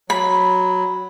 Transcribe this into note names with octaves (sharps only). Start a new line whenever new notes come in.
F#3 B5